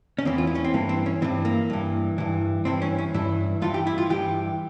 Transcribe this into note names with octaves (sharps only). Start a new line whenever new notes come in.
C#4
E2 E3 C4
F4
E4
C#4
C4
G2 E3 A#3
C4
C#4
G2 E3 C4
A#3
G2 E3
G2 E3
G2 E3 C4
C#4
C#4
G2 E3 E4
G2 E3 F4
G4
E4
F4
G2 E3 G4